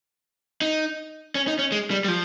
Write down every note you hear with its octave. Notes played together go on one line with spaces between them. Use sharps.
D#4
C#4
D#4
C#4
G#3
G3
G3
F3